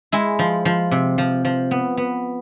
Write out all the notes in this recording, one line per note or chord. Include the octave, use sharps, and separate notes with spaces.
G#3 E4
F3
F3
C3
F3
F3
B3
B3